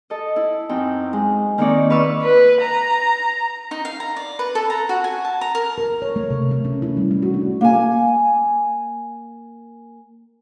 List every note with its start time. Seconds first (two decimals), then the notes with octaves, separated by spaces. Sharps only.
0.10 A4 D#5
0.36 E4
0.69 F#2 C4 D#4 G5
1.13 G#3
1.58 D#3 A#3 C4 D#4 C#5 D5
1.90 B4 D5 E5 F5 C#6 E6
2.22 B4
2.61 A#5
3.71 D#4
3.85 F5
4.00 A#5
4.17 D5
4.39 B4
4.55 A4
4.70 A#5
4.89 F#4
5.04 G#5
5.25 A5
5.41 A#5
5.55 A#4
5.78 A#4
6.02 C#5
6.16 A3
6.30 C3
6.51 A3
6.65 C#4
6.82 E4
6.97 G3
7.11 A3
7.22 F#4
7.34 D4
7.61 A#3 G#5